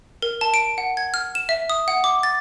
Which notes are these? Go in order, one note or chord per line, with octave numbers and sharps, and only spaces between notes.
A#4
A5
D7
F#5
G#6
F6
E7
E5
D#6
F#5
D6
A6